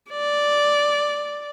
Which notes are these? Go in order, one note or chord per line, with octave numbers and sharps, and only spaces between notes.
D5